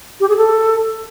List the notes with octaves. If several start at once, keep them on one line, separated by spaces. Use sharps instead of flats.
G4
G#4
A4